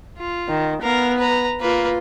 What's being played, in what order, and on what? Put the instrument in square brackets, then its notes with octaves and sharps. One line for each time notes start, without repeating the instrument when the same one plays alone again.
[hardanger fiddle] F4
[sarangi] D#3
[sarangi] B3 [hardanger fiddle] A#4 F5
[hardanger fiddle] B4 A#5
[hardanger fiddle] A#3 B4 [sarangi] F4